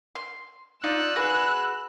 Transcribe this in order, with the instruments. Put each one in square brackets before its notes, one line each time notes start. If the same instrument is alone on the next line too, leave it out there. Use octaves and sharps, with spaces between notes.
[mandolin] C6
[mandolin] D#4 F4 D5 [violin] E6 F#6
[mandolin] F#4 G#4 B4